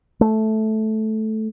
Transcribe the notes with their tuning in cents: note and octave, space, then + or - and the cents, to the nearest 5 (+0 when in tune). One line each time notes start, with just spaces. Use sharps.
A3 -10